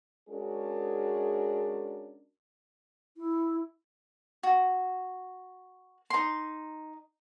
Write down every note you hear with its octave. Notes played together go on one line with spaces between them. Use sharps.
G#3 C#4 D4 F#4 G#4 A#4
E4
F#4
D#4 C6